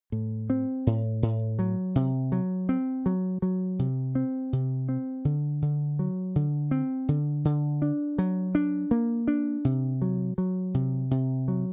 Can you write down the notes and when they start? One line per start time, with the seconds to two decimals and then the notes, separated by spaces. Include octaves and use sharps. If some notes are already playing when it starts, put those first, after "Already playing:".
0.12 A2
0.50 C4
0.87 A2
1.23 A2
1.59 F#3
1.95 C3
2.32 F#3
2.69 C4
3.06 F#3
3.42 F#3
3.79 C3
4.15 C4
4.53 C3
4.89 C4
5.25 D3
5.62 D3
5.99 F#3
6.36 D3
6.71 C4
7.09 D3
7.45 D3
7.82 D4
8.18 F#3
8.55 D4
8.91 A#3
9.28 D4
9.65 C3
10.02 F#3
10.38 F#3
10.74 C3
11.11 C3
11.48 F#3